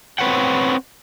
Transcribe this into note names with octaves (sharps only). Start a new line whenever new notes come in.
C4 B4 C#5 F#5 G5